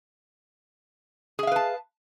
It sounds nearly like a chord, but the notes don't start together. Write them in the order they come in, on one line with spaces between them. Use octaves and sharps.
G#4 E5 F5 B4 A5